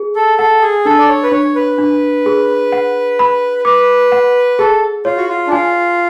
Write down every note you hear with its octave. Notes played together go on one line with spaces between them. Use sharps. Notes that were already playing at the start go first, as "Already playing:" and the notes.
Already playing: G#4
A4
A4 F#5
G#4
D4 A4
D5
C#5
B4
D4 C#5
B4
D4
G#4
F#5
B5
B4 D6
F#5
G#4 A4
F4 C#5
F#4
F4
D4
F4 G#5